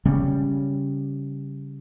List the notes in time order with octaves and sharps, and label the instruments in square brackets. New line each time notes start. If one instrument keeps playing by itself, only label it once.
[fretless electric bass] C#3 G3 C#4